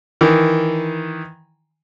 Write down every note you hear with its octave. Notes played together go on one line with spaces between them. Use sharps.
D#3 E3